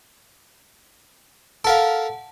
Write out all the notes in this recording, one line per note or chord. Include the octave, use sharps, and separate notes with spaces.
A4 A#4 F5 F#5 A5